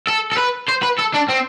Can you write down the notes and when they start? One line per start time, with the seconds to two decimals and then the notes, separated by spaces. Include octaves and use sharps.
0.08 A4
0.33 A4
0.38 B4
0.69 C5
0.83 B4
0.99 A4
1.14 D4
1.29 C4